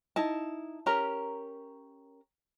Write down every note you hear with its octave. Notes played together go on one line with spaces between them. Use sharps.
D#4 E4 A5
C#4 G4 A#4 A#5